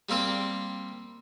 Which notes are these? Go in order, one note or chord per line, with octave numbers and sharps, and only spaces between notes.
G3 A#3 C4 G4